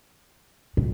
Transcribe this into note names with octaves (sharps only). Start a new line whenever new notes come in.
A2